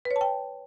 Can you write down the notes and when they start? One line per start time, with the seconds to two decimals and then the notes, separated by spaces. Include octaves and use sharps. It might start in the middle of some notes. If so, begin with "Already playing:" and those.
0.05 B4
0.11 C#5
0.16 A5
0.21 G5